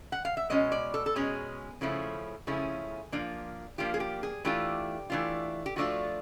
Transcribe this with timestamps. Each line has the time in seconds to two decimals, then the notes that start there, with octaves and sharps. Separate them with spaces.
0.12 F#5
0.25 F5
0.37 E5
0.50 B2 G#3 C#4 D#5
0.72 D5
0.94 A4
1.06 A4
1.16 B2 G#3 C#4 G#4
1.81 C#3 F3 A3 C#4 E4
2.47 C#3 F3 A3 C#4 E4 G#4
3.12 F3 A#3 D4 F4
3.78 F3 A#3 D4 F4 G4
3.94 G#4
4.00 G4
4.23 G#4
4.45 E3 A3 D4 F4 G4
5.10 E3 A3 D4 F4
5.66 G4
5.76 F3 A3 D4 F4 F#4